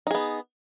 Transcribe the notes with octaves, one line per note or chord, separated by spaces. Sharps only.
B3 D#4 G#4